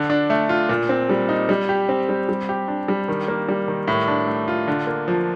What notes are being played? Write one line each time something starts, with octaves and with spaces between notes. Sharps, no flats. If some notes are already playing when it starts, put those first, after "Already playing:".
Already playing: D3
D4
A3
F4
A#2
C4
G3
D#4
G3
G4
C4
G3
G3
G4
D4
G3
D#3
A#3
G3
D#3
A2
D4
A3
F4
D3
A#3
F3